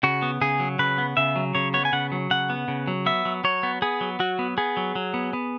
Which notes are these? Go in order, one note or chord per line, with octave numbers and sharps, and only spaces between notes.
C#3 F#4
B3
C#3 G#4
F#3
C#3 B4
B3
C#3 E5
F#3
C#3 C#5
B3 C#5
G#5
C#3 F#5
F#3
C#3 F#5
B3
C#3
F#3
B3 E5
F#3
F#3 C#5
B3
B3 G#4
F#3
F#3 F#4
B3
B3 G#4
F#3
F#3
B3
B3